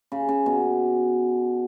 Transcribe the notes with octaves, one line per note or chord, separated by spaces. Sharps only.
C#3
C#3
B2